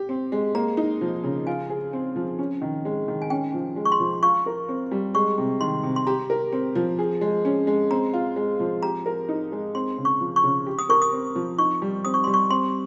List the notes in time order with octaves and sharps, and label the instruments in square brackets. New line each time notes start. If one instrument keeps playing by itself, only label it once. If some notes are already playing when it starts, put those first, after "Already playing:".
Already playing: [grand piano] G4
C4
G#3
[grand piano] A#3 [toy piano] A#5
[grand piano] D#4
F3
C#3
[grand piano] F4 [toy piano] G#5
[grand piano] G#4
C4
F3
C#4
D#3
G#3
D#3
[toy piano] G#5
[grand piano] C#4 [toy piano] G5
[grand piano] F3
G#3
[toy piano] C#6
C6
[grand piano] F3
[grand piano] F4 [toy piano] C#6
[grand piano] A#4
C4
G3
[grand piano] G#3 [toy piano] C#6
[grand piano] C3
[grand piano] D#3 [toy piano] C6
[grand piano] C3
[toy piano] C6
[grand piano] G4 [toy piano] A#5
[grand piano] A#4
C4
F3
G#4
G#3
C#4
G#3
[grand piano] C4 [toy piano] A#5
[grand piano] F4
G#3
F3
[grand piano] G4 [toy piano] A#5
[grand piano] A#4
D#4
G#3
[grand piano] C4 [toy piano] C6
[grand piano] C#3
[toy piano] C#6
[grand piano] F3
[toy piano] C#6
[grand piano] C#3
G4
[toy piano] D#6
[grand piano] A#4 [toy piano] C#6
[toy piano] D#6
[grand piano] C4
F3
[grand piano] D#4 [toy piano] C#6
[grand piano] G3
[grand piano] C4 [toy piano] D#6
[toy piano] C#6
[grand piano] G3 [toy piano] C6
[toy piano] C#6
[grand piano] C4 [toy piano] C6